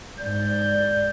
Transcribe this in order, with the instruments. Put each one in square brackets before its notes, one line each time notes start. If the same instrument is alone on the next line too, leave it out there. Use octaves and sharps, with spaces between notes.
[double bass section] G#2 [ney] D5 [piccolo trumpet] G6